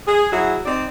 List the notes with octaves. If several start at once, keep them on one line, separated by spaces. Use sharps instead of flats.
G#4
F#3 E4 F#4 G#4
C4 D#4 D5